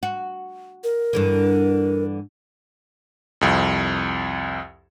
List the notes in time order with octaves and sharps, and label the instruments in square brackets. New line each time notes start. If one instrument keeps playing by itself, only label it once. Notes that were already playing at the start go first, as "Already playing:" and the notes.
[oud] F#4
[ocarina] A#4
[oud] G2 D3 E3
[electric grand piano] C2 F2